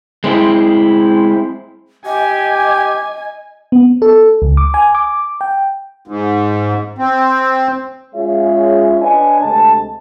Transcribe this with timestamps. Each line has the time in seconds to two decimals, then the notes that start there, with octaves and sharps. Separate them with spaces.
0.24 G#3 C4 E4
2.06 G4 D#5 G#5
3.72 B3
4.02 A4
4.42 C#2
4.57 D6
4.74 G#5
4.95 D6
5.41 G5
6.08 G#2
6.98 C4
8.14 G#3 C#4 F4 G#4 C#5 E5
9.01 D4 B4 C#5 D#5 G#5
9.42 D2 C3 G#3 A5